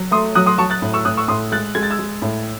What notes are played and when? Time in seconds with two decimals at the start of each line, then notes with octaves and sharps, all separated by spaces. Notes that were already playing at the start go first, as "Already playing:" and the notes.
Already playing: F#3
0.11 A3 C6 D#6
0.35 F#3 D#6 F#6
0.46 C6 D#6
0.58 F#3 A5 C#6
0.70 F#6 A6
0.82 A2
0.94 C#6 E6
1.05 A2 D#6 F#6
1.17 C#6 E6
1.28 A2 C6 D#6
1.52 G#3 F#6 A6
1.75 G#3 G#6
1.83 A6
1.90 E6 G#6
1.99 G#3
2.22 A2